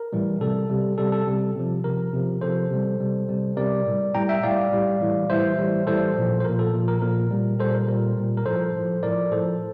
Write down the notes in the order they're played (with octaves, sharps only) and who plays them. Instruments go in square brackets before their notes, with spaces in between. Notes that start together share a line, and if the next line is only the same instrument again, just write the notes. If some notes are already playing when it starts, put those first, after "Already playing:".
Already playing: [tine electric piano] A#4
A2 E3 G3
C3 G3 A4
C3 G3
C3 G3 A4
A4
C3 G3
C3 F3
C3 F3 A#4
C3 F3
C3 F3 A4 C5
C3 G3
C3 G3
C3 G3
C3 G3 A#4 D5
A2 G3
A2 G3 G5 A#5
E5 G5
A2 G3 D5 F5
A2 G3
A2 E3 G3
A2 E3 G3 C5 E5
A2 E3 G3
A2 E3 G3 A4 C5
A#2 F3
C5
A#2 F3 A#4
A4
A#2 F3
A#4
A#2 F3 A#4
A#2 G3
A#2 G3 A4 C5
A#4
A#2 G3 A#4
A#2 G3
A#4
A2 F3 A4 C5
A2 F3
A2 F3 A#4 D5
A2 F3 A4 C5